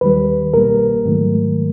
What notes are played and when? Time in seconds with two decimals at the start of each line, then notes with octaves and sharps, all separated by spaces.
0.01 D#2 D#3 G3 B4
0.53 C2 B2 G3 A#3 A#4
1.06 G#2 D#3 F#3 A3